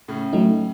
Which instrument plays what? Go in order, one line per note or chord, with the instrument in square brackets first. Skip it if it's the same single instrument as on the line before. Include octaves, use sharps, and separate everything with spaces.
[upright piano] A2 C#3
[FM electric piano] F#3 A3 D#4